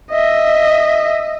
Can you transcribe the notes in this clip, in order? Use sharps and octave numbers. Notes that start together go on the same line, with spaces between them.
D#5 E5